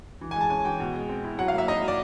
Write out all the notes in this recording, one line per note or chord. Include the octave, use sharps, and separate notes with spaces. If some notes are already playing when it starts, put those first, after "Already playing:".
E3
G#5
G#3
A5
C#4 G#5
E3 G5
B2
G#3
C4
E4
F#3 F#5
F5
A#3 E5
D#4 D#5
F#3
D5